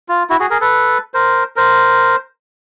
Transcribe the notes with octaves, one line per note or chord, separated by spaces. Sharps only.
F4
E4 F#4
F#4 G#4
G#4 A#4
A4 B4
A#4 C5
A#4 C5